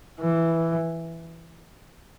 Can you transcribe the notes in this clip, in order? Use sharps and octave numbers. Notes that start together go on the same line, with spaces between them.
E3